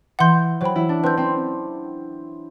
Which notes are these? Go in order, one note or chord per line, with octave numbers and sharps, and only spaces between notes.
E3 F#5 C6 G6
F#3 C5 G5 B5
E4
D4
C4 B4 F#5 A5 E6 G6
C4